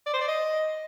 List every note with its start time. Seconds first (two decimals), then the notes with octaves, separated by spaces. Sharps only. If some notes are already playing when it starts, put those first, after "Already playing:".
0.06 D5
0.13 C5
0.21 D5
0.28 D#5